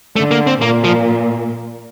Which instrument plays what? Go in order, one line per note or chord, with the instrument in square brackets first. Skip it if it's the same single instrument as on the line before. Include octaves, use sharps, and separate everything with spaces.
[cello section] D3 [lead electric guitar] A3
[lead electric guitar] A#3
C4
[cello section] A#2 [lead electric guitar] A#3
[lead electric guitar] F3